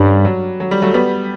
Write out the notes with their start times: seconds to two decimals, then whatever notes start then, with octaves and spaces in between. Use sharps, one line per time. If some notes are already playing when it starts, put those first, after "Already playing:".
Already playing: G2 G3 C#4 D4
0.25 F#3
0.60 F#3
0.71 G3
0.82 F#3 A3
0.94 G3 B3